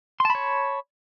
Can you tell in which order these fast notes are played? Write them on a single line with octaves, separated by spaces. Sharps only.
C6 A5 B5 C#5